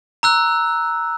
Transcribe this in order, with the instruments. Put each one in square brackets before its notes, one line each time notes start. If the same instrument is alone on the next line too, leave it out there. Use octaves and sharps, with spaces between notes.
[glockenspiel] A#5 E6 F#6